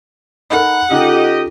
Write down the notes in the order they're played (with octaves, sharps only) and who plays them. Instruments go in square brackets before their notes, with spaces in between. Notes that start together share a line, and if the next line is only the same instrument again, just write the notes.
[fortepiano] D#4 A4 A#4 [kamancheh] F#5 [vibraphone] B5
[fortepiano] C#3 D#4 D6 [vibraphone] F4 A4 [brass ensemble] G4 D#5